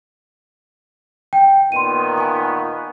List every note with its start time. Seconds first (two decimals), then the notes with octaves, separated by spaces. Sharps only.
1.33 G5
1.72 A#2 D#3 B3 C6 D#7
2.18 G#5 C#6